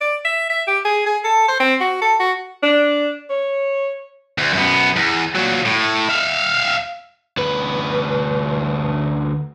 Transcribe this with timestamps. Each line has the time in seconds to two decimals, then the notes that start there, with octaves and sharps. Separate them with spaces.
0.01 D5
0.25 E5
0.50 E5
0.68 G4
0.85 G#4
1.06 G#4
1.24 A4
1.48 C5
1.60 C4
1.81 F#4
2.02 A4
2.20 F#4
2.63 D4
3.30 C#5
4.38 D2
4.53 F#2 B3
4.96 E2
5.35 A#2 F#3
5.65 A2
6.09 E5 F5
7.37 D2 B4